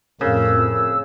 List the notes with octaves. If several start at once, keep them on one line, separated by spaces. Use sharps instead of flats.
F2 A2 C#3 A#4 E6